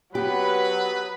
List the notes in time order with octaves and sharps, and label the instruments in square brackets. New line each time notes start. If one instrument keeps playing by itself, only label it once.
[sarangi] F#3 [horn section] B3 B4 [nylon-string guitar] G4